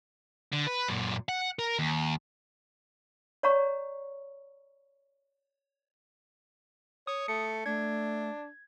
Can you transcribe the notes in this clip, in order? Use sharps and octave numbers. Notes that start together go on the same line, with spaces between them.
D3
B4
F#2 A#2
F#5
A#4
D#2
C#5 D5 F5 A#5 C#6
C#5 D#6
A3 C#7
A3 D4 G#6